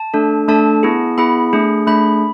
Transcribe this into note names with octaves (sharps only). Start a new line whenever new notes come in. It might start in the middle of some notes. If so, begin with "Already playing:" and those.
Already playing: A5
A3 D4 A4
A3 D4 A4 A5
B3 E4 G#4
B3 E4 G#4 B5
A3 D4 G#4
A3 D4 G#4 B5